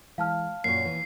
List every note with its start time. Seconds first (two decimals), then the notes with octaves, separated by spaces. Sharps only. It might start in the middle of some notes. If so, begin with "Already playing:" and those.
0.18 E3 G#3 F5 A5 F6
0.64 F#2 A#2 A#3 C#5 C7
0.85 E3